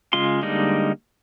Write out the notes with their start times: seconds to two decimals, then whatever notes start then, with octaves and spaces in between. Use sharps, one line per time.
0.13 C#3 G#3 F4 C6
0.42 D3 G3 G#3 A#3 D#4